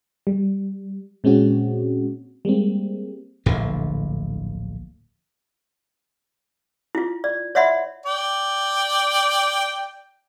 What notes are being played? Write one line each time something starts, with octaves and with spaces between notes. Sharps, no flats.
G3
A#2 G#3 C4 C#4 F#4
G3 G#3 A#3 C4
D1 A#1 A2 D3
E4 F4
D5
C#5 D5 E5 F#5 B5 C6
D5 G5